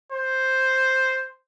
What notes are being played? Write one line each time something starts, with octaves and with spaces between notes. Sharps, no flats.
C5